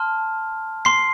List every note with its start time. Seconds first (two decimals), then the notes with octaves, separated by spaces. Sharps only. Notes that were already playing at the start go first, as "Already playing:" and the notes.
Already playing: A5 C6 F6
0.85 C6 C7